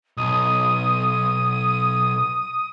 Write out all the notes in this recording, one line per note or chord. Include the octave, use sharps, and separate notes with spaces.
B1 D#6